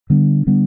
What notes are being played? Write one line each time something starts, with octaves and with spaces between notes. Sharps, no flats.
D3 G3 B3 D4
D3 G3 B3 D4